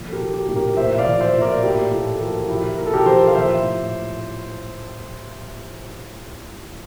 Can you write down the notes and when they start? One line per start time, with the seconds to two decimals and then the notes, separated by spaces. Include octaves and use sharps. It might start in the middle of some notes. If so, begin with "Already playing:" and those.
Already playing: A#2 F3
0.09 A4
0.12 G4 A#4
0.20 F3
0.34 G4 A#4
0.48 A2
0.56 G4 A#4
0.77 A#2 C5 E5
0.98 D5 F5
1.06 F3
1.20 C5 E5
1.35 A#2
1.41 A#4 D5
1.63 A2 E4 G4
1.92 A2 F4 A4
2.15 A4
2.20 F3 G4 A#4
2.44 F4
2.48 F3 E4 G4
2.78 A#2 A#4
2.86 A4
2.94 G4 A#4
3.06 F3 A4 C5
3.28 F5
3.35 F3 C5 E5
3.63 A2